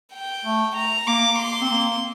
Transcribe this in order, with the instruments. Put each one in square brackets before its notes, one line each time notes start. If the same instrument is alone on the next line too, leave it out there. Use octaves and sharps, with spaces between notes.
[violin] G5
[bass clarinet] A3
[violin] A#5
[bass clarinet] A#3 [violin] D6
[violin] C6
[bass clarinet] C4
A#3